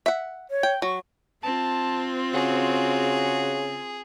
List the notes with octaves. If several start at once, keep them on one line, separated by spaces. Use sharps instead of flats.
E5 F#5
C#5
G5
F#3 C#6
C4 F4 A5
C#3 F#4 G#4